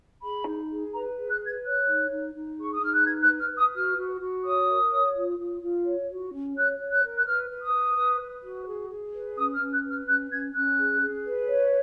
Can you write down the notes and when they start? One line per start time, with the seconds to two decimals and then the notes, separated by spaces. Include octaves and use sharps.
0.22 G#4 B5
0.47 D#4
0.69 G#4
0.93 B4 A#5
1.17 G#4
1.28 F#6
1.40 B4
1.46 G#6
1.64 C#5 F#6
1.86 D#4
2.10 D#4
2.33 D#4
2.57 G#4 C#6
2.73 D#6
2.81 D#4 F6
2.94 F#6
3.04 B4 G#6
3.22 F#6
3.27 B4
3.38 F6
3.51 B4
3.57 D#6
3.74 F#4 F6
3.97 F#4
4.21 F#4
4.45 C#5 D#6
4.68 A#4
4.91 C#5
5.15 F4
5.39 F4
5.62 F4
5.85 C#5
6.08 F#4
6.31 C#4
6.55 C#5 F#6
6.78 C#5
6.91 F#6
7.02 A#4
7.16 F#6
7.25 B4 F6
7.50 B4
7.61 D#6
7.72 B4
7.96 B4
8.20 B4
8.42 F#4
8.67 G#4
8.90 G#4
9.13 B4
9.37 C#4 D#6
9.54 F6
9.60 C#4
9.72 F#6
9.83 B4
9.90 F6
10.07 C#4 F#6
10.30 C#4 G#6
10.54 C#4 F#6
10.78 G#4
11.01 G#4
11.24 B4
11.47 C#5